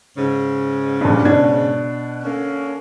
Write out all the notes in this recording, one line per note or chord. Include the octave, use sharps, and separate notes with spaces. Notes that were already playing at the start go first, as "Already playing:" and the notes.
G#2 C#3
G2 A#2
B2 D4 G#6
D3 A#3 C#4